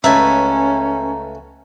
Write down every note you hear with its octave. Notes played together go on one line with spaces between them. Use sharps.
C#2 A3 C#4 B4 E5 G#5 A#5